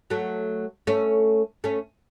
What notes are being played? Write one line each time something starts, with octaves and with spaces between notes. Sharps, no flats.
F#3 A3
A3 C#4
A3 C#4